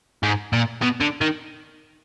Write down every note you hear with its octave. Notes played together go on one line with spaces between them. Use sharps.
G#2
A#2
B2
D3
D#3